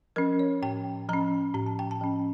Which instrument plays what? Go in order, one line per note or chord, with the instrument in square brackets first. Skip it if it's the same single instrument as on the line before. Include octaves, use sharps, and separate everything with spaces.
[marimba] F3 C#4 A#4
C#5
A2 G5
F3 C#4 A#5
A2 A#5
A5
G5
A5
F3 C#4